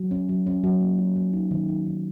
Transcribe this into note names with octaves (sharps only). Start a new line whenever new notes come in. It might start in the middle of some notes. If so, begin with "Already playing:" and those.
Already playing: F#3
C#4
F#3
C#4
F#3
A#3
F4
F#3
D#4
D#3
D#4
D#3